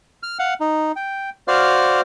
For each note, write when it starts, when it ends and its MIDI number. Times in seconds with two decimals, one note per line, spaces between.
0.23 0.38 89
0.39 0.54 77
0.39 0.54 78
0.60 0.92 63
0.96 1.30 79
1.48 2.01 66
1.48 2.01 72
1.48 2.01 74
1.48 2.01 77
1.48 2.01 89